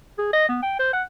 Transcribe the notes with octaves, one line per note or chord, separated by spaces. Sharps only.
G#4
D#5
B3
G5
C5
F#5